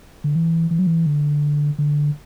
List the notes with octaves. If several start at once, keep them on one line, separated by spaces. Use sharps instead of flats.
D3
E3
E3
F#3
E3
D3
D3